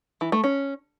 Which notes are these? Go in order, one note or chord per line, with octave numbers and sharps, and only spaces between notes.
E3
A3
C#4